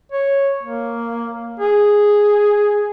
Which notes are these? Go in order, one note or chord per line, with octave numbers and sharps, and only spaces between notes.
C#5
A#3
G#4